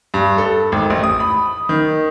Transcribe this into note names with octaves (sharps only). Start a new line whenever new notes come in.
G2
A4
G#1
A1
D#6
B5
D#3